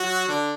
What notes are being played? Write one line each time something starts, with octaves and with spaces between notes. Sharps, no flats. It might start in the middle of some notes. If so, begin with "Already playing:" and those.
Already playing: F#3 F#4
D3 D4